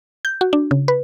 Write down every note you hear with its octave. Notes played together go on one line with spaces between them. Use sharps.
G6
F#4
D4
C#3
B4